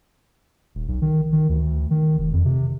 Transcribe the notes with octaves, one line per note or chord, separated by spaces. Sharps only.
D#1
B1
D#3
D#3
D2
D#3
F1
F2
C3